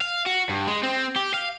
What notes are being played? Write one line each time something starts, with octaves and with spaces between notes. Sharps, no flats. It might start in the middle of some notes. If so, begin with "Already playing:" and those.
F5
F#4
G2
G#3
C4
G4
F5